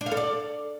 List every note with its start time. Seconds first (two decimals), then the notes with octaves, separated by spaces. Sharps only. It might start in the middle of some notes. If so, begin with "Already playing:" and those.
0.01 D4
0.06 F5
0.12 A4
0.17 D5